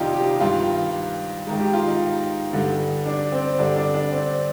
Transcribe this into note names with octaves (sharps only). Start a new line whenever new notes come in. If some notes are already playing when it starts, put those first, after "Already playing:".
Already playing: F2 C3 D#3 D4 D#4 F4 G4
G4
G2 D#3 F4
G#2 D#3
G4
F4
D#4
G2 D3
D4
C4
G2 D3 D4
D4
D4
C4